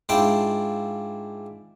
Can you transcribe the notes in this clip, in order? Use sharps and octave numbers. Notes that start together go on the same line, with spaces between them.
G#2 D4 E4 F4 G5